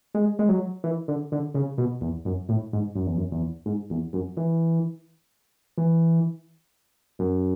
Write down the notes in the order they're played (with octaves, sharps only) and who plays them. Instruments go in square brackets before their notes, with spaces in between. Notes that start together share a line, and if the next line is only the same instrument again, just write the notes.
[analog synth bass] G#3
G#3
F#3
E3
D3
D3
C#3
B2
E2
F#2
A2
G#2
F#2
E2
F#2
E2
G#2
E2
F#2
E3
E3
F#2